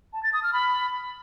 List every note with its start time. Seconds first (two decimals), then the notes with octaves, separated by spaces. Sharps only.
0.13 A5
0.23 A6
0.33 D#6
0.43 F6
0.53 B5